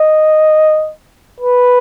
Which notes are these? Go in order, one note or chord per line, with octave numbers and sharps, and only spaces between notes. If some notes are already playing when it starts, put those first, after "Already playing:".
Already playing: D#5
B4